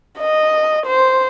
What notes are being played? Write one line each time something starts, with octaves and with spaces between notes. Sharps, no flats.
D#5
C5